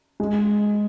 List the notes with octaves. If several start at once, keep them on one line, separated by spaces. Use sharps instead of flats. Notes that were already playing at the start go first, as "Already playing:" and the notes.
G#3